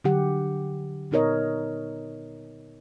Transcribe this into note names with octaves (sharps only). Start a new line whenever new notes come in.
D3 F#3 G4 F#5
A#2 B3 D#4 A#4 C#5 D#5